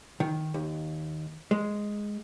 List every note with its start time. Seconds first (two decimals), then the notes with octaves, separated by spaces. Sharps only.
0.20 D#3
0.54 D#2
1.51 G#3